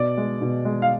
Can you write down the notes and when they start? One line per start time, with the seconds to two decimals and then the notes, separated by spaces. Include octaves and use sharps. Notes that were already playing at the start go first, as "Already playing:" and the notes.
Already playing: B2 D5
0.17 G#3
0.41 B2
0.65 G#3
0.82 F5